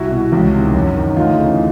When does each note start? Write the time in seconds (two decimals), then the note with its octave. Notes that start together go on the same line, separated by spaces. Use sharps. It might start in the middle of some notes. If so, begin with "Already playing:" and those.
Already playing: C2 E4 F#4
0.11 B2
0.32 C#2
0.54 C3 D#3
0.74 F#2
0.96 D#3
1.17 D2 D#4 F4
1.38 C#3 E3